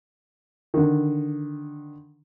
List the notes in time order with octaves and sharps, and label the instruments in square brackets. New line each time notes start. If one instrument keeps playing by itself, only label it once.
[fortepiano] D3 D#3